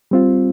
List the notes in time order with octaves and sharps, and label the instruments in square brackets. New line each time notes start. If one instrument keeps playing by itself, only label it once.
[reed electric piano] G3 C4 F4